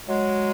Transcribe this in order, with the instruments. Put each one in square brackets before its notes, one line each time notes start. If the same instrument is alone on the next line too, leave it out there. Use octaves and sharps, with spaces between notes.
[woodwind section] F#3 G#3